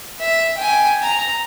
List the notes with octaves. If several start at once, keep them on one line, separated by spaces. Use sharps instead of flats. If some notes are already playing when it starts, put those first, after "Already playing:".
E5
G5 G#5
A#5